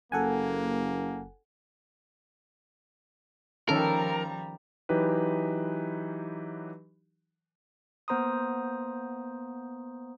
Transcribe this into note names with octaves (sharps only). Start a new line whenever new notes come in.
F#1 A#3 A4 F#5 G#5
D#3 F3 G3 C#4 A4 A#4 A#5
E3 F#3 D#4 G4 B4
A#3 B3 C5 A#5 C6 D#6